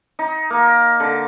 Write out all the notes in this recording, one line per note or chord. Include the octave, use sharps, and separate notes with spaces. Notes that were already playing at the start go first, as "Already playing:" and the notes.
D#4
A#3
D3